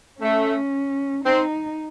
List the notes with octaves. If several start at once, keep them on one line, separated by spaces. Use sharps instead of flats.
A3 C#4
C4 D#4